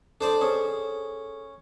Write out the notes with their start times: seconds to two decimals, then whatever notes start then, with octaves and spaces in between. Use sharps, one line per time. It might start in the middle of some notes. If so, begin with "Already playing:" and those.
0.21 D4 A4 C5 D5
0.41 C#4 G#4 A4 D#6